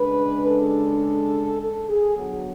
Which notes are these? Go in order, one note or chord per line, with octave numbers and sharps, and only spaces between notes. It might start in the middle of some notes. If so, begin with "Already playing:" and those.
Already playing: C#3 G#3 D4 B4
A4
A4
G#4
D3 F#3 B3 F#4